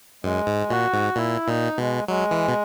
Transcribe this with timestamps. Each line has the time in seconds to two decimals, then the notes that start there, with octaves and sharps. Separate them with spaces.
0.24 F#2 G#3
0.47 G#2
0.70 A#2 F#4
0.93 G#2
1.16 A#2 E4
1.47 A#2 D#4
1.78 B2 G#3
2.08 F#3 G#3
2.31 E3
2.48 B2